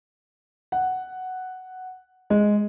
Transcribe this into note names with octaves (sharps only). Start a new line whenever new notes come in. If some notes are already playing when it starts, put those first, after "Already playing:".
F#5
G#3